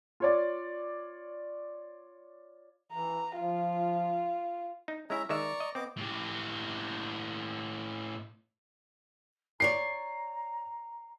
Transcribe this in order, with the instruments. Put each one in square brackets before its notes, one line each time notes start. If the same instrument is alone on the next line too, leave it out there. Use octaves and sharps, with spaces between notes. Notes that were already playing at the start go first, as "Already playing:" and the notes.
[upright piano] F4 C#5 D5
[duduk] E3 [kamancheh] A#5
[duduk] F3 [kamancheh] F4
[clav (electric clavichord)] D#4
[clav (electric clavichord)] G#3 E4 [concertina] C#4 E5 A#5
[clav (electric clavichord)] D#3 G#3 E5 [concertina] D5 A#5 C#6
[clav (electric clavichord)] D#5
[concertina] B3 D#5 D6 [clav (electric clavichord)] C4
[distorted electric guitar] A2 G4
[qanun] C#5 D5 G5 [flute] A#5 [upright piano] C7